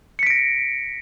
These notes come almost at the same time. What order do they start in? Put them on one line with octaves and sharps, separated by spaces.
C#7 B6 D7 A#6